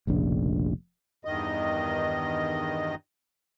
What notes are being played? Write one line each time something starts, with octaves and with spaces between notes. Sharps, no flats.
F1 A#1 C#3 D4
E2 G2 D#3 D#5